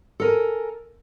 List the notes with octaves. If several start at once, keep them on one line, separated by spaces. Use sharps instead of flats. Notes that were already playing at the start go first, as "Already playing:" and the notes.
A4 A#4 G#5